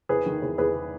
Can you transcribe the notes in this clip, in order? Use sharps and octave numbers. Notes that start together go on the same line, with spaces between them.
E2 G#4 B4
D#3
E2
E2 G#4 B4